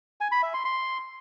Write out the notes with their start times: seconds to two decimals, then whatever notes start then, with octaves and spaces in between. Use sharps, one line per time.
0.21 G#5
0.32 B5
0.43 E5
0.54 C6
0.65 C6